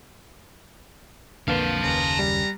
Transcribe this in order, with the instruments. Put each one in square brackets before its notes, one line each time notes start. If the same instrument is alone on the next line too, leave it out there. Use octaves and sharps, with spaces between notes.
[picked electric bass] B1 F2 D3 [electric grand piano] A#3 B4 [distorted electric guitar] F5 A5
[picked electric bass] F#1 D#2 C#3 [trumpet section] B3 A#5
[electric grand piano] G3